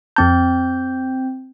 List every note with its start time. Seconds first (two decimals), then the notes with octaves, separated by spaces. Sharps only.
0.16 F2 C4 A5 G6